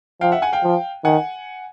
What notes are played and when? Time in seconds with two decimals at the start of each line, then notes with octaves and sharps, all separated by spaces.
0.21 F3 F5 G5
0.32 E5 F#5
0.42 F#5 G#5
0.53 F5 G5
0.63 F3
1.04 D#3 F#5 G#5